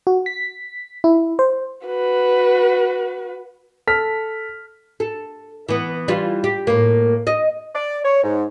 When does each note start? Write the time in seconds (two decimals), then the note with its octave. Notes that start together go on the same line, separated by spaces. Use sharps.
0.07 F#4
0.26 B6
1.04 E4
1.39 C5
1.87 F#4 B4
3.87 A4 F6 B6
5.00 A4
5.69 E3 B3
6.08 E3 G3 F4
6.44 G4
6.67 A2 A#3
7.27 D#5
7.74 D5
8.05 C#5
8.23 G#2